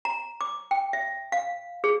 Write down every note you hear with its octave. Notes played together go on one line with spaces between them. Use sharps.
A#5
D6
G5
E5
F5
G#4